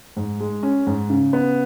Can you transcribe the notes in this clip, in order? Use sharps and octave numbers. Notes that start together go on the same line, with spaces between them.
G#2
G#3
C#4
G#2
C#3
B3